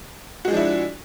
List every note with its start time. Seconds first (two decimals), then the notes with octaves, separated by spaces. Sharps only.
0.45 F#4
0.48 G#3
0.51 F3
0.54 D4
0.57 E4